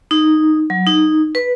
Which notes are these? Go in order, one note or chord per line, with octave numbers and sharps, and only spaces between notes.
D#4
F#3
D#4
B4